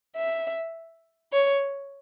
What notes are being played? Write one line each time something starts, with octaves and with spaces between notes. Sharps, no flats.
E5
C#5